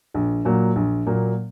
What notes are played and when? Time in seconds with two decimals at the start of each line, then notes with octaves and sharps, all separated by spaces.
0.14 A#1
0.45 A#2 F#3 A#3
0.76 A#1
1.06 A#2 F#3 A#3